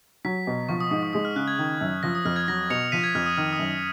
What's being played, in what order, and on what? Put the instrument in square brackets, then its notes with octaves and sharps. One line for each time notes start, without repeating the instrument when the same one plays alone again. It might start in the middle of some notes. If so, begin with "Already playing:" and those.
[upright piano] F#3 [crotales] B6
[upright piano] B2
[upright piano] F3 [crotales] C#6
[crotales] D#6
[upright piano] G#2 [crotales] D#6
[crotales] C#6
[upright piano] G#3 [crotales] D#6
[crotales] F6
[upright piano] C#3 [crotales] F#6
[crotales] G#6
[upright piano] D#3
F#2
[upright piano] F3 [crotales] A#6
[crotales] D#6
[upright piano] F2 [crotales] F6
[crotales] G#6
[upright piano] F#3 [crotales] A#6
[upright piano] B2 [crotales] C#7 F7
[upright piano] F3 [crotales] B6 D#7
[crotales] G#6
[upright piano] F2 [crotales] F6
[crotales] D#6
[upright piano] D#3 [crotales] F6
[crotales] D#6
[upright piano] F#2